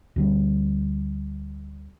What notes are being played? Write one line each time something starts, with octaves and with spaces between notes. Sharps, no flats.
D2 D3 G3